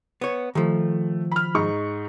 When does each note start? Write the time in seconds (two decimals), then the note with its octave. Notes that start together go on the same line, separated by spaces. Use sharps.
0.21 B3 C#5
0.55 D#3 F3 A3
1.32 B5 F6
1.54 G#2 D#4 C#6